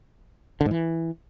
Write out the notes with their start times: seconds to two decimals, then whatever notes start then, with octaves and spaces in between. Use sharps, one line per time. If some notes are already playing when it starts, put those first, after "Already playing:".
0.61 D3
0.66 G#2
0.71 E3